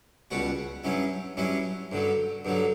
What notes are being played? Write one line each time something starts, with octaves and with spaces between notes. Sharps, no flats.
C#2 B2 G3 B3 F#4
G2 F#3 C#4 E4
G2 F#3 C#4 E4
G2 D3 F#3
G2 D3 F#3